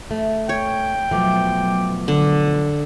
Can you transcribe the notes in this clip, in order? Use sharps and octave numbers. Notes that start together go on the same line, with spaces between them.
A3
C#5 G5
B2 F3 F#3 A3 D6
D3